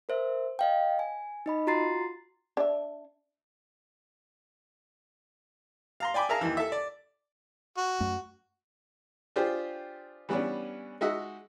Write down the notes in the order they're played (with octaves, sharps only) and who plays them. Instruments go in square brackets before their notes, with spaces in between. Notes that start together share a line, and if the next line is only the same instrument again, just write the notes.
[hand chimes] A#4 C5 E5
D#5 F5 G5
G#5
D#4 D#5 B5
F4 F#4 A#5 C6 A6 C7
[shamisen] D4 E5
[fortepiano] F5 A#5 C6
D5 G5 G#5 B5 D6
G#4 A#4 E5 F5 A5 A#5
D#2 E3
A4 E5
D5
[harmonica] F#4
[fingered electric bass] F#2 A3
[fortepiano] D4 F4 G4 G#4 C5
E3 G3 B3 C#4 D4
G#3 D#4 F#4 D#5 E5 F#5